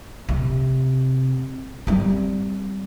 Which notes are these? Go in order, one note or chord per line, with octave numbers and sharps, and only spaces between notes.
C3
G3 C4